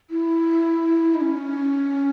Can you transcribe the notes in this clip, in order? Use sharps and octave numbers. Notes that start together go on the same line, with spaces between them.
E4
D#4
C#4